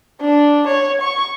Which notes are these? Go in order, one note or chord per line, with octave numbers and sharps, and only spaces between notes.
D4
C#5
C#6